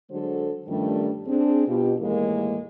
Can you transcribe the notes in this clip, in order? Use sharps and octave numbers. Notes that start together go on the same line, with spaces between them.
D3 F#3 G#3 F#4 A4 C5
G2 D#3 F3 G3 A3 C#4
C4 D4 G#4
B2 F4 G4
D#2 A2 E3 G#3 A#3